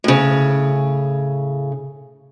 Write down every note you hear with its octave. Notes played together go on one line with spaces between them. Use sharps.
A2 C#3